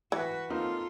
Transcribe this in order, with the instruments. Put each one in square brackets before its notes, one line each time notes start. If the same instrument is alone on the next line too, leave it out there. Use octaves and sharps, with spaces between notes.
[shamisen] E3 [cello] F#4 B4
[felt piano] A#3 C4 D#4 [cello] F4 A4